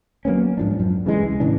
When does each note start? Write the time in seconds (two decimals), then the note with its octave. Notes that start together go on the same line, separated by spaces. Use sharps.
0.25 F#3 A#3 B3 C#4
0.58 G#2 F3 D4
0.80 F#2
1.06 C#3 E3 G#3
1.23 C#2
1.40 A2 C#3 E3 D4